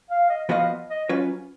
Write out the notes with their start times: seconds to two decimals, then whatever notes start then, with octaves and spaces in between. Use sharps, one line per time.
0.10 F5
0.29 D#5
0.49 F3 B3 F#4 B4 D#5 F5
0.90 D#5
1.09 F#3 C#4 F4 B4 C#5